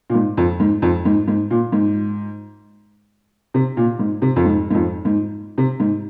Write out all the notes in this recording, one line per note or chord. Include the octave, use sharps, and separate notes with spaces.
A#2
G#2
F2
G#2
F2
G#2
G#2
A#2
G#2
C3
A#2
G#2
C3
F2
G#2
G#2
F2
G#2
C3
G#2